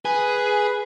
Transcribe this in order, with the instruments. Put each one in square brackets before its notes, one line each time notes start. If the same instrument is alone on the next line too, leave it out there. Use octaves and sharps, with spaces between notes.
[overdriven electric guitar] G#4 [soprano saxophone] B4